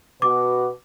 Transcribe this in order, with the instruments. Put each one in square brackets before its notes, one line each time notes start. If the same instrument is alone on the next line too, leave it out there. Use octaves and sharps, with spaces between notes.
[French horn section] B2 F#4 B4 [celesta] D6